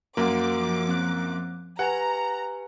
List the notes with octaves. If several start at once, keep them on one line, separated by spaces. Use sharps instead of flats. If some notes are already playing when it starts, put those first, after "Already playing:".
F#2 F3 A#3 F#4 F5 F#5 D6
C4 F#6
G4 B4 F#5 G#5 A#5